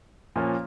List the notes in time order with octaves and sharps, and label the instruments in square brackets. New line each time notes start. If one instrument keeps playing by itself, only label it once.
[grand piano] A#2 F3 A#3 C#4